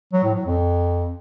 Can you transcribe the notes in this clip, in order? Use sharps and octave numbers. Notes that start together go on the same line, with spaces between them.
F#3
A2
F#3
F2